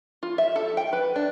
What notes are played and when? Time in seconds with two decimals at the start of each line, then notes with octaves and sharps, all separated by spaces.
0.23 F4
0.38 E5
0.56 A4
0.77 G5
0.93 B4
1.16 D4